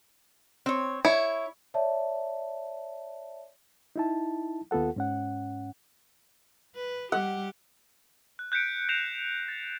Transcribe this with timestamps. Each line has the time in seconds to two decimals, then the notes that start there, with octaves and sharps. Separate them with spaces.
0.66 C4 C#5
1.05 E4 C#5
1.74 C#5 D5 E5 A5
3.96 D#4 E4 A5
4.71 D#2 B3 F4 A4 F#5
4.96 G#2 C#4 F#5
6.75 B4
7.12 G3 G4 F#5
8.39 F#6
8.52 F#6 G6 B6 C#7 D7
8.89 G6 A#6 C7 D7 E7 F7
9.48 A6